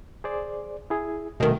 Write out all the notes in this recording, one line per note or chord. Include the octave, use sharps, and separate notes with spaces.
G#4 C5 D5
E4 G#4
C2 B2 D#3 A3 D#5